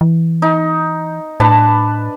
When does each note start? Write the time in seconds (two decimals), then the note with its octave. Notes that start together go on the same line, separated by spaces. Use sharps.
0.01 E3
0.42 D#4
1.40 A2 D4 B4 A5